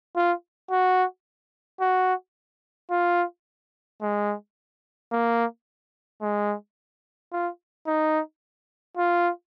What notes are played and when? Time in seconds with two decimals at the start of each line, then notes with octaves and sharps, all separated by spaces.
0.16 F4
0.71 F#4
1.81 F#4
2.91 F4
4.02 G#3
5.12 A#3
6.22 G#3
7.32 F4
7.87 D#4
8.97 F4